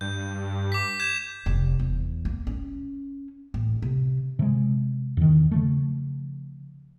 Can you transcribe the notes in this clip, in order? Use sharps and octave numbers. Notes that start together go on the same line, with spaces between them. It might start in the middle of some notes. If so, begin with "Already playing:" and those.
G2 G6
D6 B6
G6 G#6 E7
F1
E2
A#3
C#4
A1
C3
C3 G#3
E2 D#3
C#3 F3 A3